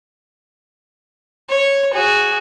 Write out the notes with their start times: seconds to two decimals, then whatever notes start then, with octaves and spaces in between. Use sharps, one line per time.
1.49 C#5
1.93 F#4 G#4